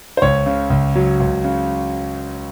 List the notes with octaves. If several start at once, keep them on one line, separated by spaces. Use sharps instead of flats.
C5
C#2 C#5
C#3
C#2
F#3
C#2
C#3